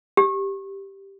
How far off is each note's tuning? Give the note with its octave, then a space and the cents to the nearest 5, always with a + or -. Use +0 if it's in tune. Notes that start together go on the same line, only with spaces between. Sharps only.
G4 +0